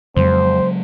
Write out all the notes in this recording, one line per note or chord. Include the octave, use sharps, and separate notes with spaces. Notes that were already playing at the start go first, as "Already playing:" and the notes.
F2 C#3 F#3 G#3 C5